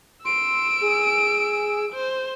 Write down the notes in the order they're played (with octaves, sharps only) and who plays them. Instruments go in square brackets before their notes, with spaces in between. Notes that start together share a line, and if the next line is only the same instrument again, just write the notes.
[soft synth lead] C6 [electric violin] E6 D7
[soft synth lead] G#4
[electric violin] C5